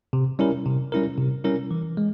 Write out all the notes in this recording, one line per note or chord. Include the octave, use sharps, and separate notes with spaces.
C3
G3 C#4 E4 A#4
C3
G3 C#4 E4 A#4
C3
G3 C#4 E4 A#4
E3
G#3